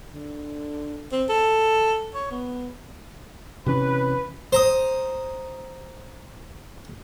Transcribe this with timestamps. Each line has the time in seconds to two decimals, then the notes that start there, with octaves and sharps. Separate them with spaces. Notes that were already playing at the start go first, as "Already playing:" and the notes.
0.13 D3
1.12 C4
1.29 A4
2.15 C#5
2.31 B3
3.66 C3 E3 C#4 B4
4.53 C5 A#5 D#6